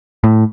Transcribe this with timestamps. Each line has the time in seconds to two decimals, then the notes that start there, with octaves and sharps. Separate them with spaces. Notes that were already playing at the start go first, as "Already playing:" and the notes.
0.24 A2